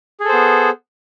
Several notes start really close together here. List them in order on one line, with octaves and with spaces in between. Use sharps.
G#4 A4 C5 B3